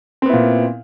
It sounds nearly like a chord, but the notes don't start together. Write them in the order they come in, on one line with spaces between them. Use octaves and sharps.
C4 B3 E4 A#2